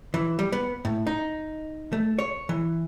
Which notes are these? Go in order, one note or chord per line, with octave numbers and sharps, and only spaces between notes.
E3
G3
B3
A2
D#4
A3
C#5
E3